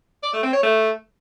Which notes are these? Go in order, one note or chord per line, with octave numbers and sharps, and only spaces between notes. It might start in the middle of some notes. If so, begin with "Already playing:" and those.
D5
A3
C4
C#5
A3